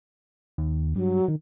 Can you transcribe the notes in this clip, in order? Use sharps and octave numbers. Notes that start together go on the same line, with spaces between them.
D#2
G2 F#3
D#3